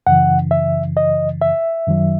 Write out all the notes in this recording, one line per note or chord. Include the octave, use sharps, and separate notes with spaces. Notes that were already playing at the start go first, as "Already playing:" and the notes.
F#2 C#3 E3 F#5
E5
D#5
E5
F#2 D#3 F#3